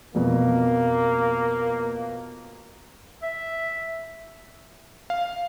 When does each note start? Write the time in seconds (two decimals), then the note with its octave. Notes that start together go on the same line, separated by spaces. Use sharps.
0.14 F2 B2 A#3
3.23 E5
5.10 F5